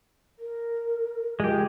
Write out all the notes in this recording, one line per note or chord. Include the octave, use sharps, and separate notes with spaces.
A#4
G#3 F4 G4